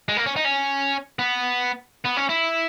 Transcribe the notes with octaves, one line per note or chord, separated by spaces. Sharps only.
G#3
A#3
C#4
D#4
C#4
B3
B3
C#4
E4